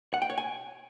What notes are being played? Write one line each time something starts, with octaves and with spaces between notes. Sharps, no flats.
F#5
G5
C#5
G#5